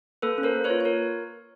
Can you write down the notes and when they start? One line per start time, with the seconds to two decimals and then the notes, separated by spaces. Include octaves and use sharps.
0.22 A#3 A4 B4
0.38 C#4
0.43 A#4 C5
0.54 A#3
0.64 B4 C#5
0.70 F4
0.80 C#5
0.85 A#4